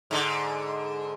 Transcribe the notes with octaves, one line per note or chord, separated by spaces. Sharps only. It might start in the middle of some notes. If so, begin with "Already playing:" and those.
G#2 D3